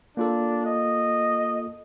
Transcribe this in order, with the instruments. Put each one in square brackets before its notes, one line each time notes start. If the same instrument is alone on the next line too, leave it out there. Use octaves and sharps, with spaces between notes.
[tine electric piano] A#3 F4 A4 [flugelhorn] D4
[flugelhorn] D#5